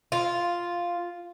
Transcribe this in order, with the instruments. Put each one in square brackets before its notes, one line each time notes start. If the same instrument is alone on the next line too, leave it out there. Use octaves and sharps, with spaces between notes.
[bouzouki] F4